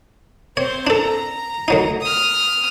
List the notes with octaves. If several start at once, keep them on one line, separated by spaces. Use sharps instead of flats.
C4 C5 C#5
D4 A4 A#5
D2 F#3 D#4
D#6 F6